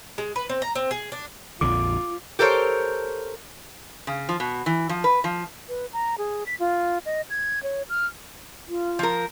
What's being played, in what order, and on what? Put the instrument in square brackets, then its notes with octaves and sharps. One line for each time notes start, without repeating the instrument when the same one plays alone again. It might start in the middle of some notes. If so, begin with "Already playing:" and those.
[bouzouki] G#3
B4
C4
A#5
C4
G#4
D4
[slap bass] A#1 F2 D3 [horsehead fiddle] F4 [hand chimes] D6
[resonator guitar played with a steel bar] G4 A4 A#4 C5 C#5
C#3
F3
B2
E3
F3
B4
F3
[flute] B4
A#5
G#4
B6
F4
D#5
G#6
C#5
F6
[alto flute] F4
[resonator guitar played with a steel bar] F3 A#4